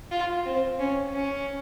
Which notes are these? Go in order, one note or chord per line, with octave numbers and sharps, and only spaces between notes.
F4
C4
C#4
C#4